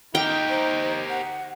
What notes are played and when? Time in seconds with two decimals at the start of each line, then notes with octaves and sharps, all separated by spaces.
0.15 D#4 G4 A#4 G5
0.49 C5
1.10 F#5